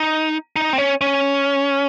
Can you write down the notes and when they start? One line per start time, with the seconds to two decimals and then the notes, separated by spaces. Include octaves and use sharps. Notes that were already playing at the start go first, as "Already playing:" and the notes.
Already playing: D#4
0.56 D#4
0.73 C4
0.78 C#4
1.01 C#4